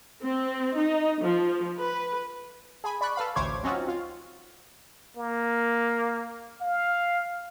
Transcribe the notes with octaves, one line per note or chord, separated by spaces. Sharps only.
C4
D#4
F3
B4
G#4 G#5 B5
D5 B5 C#6 F#6
A4 B4 F5 B5
A1 D2 C5 C#5 D6 G#6
F#3 C4 C#4 D#4 F4 F#4
F4
A#3
F5